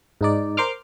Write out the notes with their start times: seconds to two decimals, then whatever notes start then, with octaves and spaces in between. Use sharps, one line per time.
0.21 G#2 D#4 D5
0.57 A#4 C5 C6 D6 F6